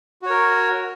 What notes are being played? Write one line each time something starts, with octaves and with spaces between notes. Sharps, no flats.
F#4 A#4 C#5